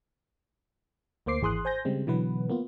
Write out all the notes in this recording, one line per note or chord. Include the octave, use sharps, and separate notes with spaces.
D2 A#3 C5 D6 C7
G#1 E3 G#4 C6 D#6 F#6
C5 G#5 G6 A#6
C#3 G3 G#3 C4
B2 D3 E3 F#3 B3 B4
A#3 B3 F4